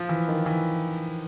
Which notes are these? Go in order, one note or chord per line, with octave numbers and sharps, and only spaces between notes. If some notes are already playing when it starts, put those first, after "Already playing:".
Already playing: F3
E3
D#3
E3